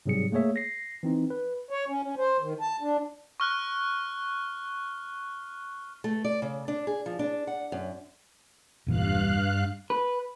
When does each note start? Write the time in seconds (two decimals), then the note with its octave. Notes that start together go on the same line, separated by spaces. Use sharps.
0.06 G#2 C3 F#3 G3 G#4 C#7
0.32 A3 A#3 G#4 C#5 E5
0.56 A#6 C7
1.03 E3 C4 D#4
1.30 B4
1.70 C#5
1.88 C#4
2.03 C#4
2.18 C5
2.41 D#3
2.61 A5
2.81 D4
3.40 C#6 F6 F#6
6.04 A3
6.24 D5
6.42 C#3
6.68 D4
6.87 G#4
7.06 F3
7.19 D4
7.47 F#5
7.72 F#2
8.87 E1 G2 A#2 E3 F5 F#6
9.90 B4